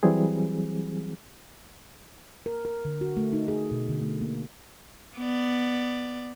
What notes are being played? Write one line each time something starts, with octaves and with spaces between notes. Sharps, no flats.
E3 F#3 G3 C4 G#4
A#4
A#4
D3
F#4
A3
D#4
G#4
B2
D3
A3
A#3
B3 D5